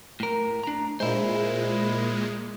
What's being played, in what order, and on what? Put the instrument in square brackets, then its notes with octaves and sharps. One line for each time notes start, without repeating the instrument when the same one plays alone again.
[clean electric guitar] A2 A#4
D4 A#5
[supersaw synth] A#2 G#3 [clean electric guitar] E4 C5